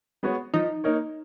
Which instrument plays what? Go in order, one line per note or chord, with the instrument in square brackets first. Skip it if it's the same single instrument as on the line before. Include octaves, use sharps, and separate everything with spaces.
[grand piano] G#3 B3 F#4 C#5
[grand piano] F3 [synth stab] D#4
[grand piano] A#3 D#4 A#4 C#5